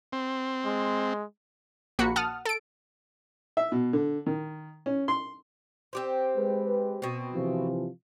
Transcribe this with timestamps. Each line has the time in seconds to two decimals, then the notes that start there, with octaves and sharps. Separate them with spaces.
0.12 C4
0.65 G#3
1.99 A#1 A#3 F#4 B5 C#7
2.16 F#5 A5 D#6 F6
2.45 A4 D7
3.57 E5
3.72 B2
3.93 D3
4.26 D#3
4.86 C#4
5.08 C6
5.93 C4 G4 C5
6.36 G#3 B4
7.02 B2 C4
7.33 C3 E3 F3